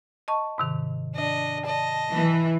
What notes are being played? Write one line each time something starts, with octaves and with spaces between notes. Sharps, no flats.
D#5 A5 C#6
G#2 C3 D#3
D4 D#5
D#5 A5
E3